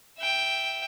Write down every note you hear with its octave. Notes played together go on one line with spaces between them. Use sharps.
E5 G5